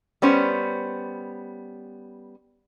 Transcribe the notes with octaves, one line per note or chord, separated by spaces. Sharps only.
G3 B3 C#4 C5